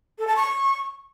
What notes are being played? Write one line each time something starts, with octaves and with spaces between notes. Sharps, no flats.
A4
A5
C#6